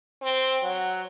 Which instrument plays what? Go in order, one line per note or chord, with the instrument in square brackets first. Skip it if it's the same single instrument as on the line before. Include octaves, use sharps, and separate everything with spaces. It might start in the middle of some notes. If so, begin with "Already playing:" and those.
[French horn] C4
F#3